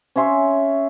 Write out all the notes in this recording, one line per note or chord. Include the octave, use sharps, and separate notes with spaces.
C#4 C#5 E5 C6